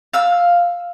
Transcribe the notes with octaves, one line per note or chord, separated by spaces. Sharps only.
F5 E6